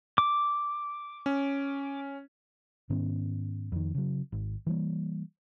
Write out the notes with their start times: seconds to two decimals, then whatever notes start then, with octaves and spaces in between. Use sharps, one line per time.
0.18 D6
1.26 C#4
2.90 G#2 D#3 B3 C#4
3.72 F2 D#3
3.95 C#3 F#3
4.32 G#1
4.67 E3 G3 A#3